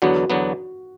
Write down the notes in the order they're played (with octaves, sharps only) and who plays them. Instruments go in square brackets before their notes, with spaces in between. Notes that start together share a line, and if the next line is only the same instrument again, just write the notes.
[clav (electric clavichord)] E2 D3 F#3 B3 [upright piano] F#4
[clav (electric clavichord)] E2 D3 F#3 B3